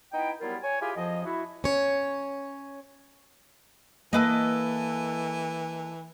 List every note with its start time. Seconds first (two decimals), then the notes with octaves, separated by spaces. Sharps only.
0.13 B3 D#4 E4 D#5 G5
0.41 F#3 G3 B3 E4 F4 A#4
0.62 C#5 G#5
0.80 E4 F4 G4 G#4 G#5
0.95 F2 F3 D#5
1.25 E4 F#4
1.64 C#4 C#5
4.13 E3 A#3 A4 B4 D#5